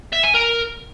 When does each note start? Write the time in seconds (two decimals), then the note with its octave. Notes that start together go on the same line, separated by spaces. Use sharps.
0.12 E5
0.23 G#5
0.34 A#4